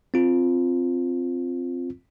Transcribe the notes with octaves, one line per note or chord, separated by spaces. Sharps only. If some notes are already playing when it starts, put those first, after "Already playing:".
C4 F4